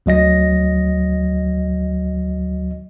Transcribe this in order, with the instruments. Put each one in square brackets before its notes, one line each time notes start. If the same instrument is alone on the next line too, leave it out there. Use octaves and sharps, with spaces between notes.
[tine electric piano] D2 F#3 D#5 A#6